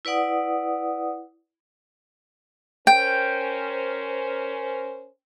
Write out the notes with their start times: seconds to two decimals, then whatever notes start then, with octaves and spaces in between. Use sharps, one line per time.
0.05 E4 B4 D5 F#5 D#6
2.87 C#4 A#4 C5 G5